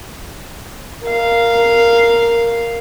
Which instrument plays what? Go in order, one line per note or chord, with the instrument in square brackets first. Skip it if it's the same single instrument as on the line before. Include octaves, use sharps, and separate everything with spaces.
[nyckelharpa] A#4 F5